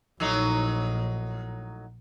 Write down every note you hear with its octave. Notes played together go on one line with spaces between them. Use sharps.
A#1 A2 F#3 D#4